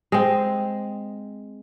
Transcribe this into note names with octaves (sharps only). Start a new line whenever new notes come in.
G#3 C4